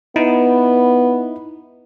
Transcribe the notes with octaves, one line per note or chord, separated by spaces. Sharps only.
B3 D#4 E4